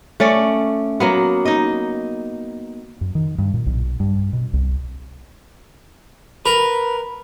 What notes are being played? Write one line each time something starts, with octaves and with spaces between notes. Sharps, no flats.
A3 C#4 D5
F#3 A#3 B3
D#4 D#5
F#2
D#3
G2
A#2
B1
G2
B2
C2
A#4 B4